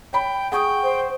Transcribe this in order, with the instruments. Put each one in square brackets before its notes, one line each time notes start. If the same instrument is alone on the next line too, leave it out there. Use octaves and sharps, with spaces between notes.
[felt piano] C#5 B5 [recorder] G5
[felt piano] G#4 [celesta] F#5 C#6 D#6 [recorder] G5
[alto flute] C5